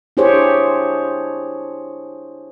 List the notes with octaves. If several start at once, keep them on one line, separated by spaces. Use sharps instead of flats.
D4 E4 G4 G#4 C5 C#5